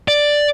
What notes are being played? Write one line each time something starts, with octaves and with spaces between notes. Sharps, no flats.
D5